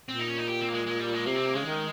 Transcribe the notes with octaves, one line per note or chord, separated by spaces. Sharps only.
A#2 C4
D#4
C#4
D#4
G4
C4
A#3
G#3
G#3
G3
G#3
C3 A#3
C4
A#3
C#3 G#3
D#3